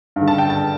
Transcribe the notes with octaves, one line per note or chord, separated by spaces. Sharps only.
G2
D3
A5
G5
A5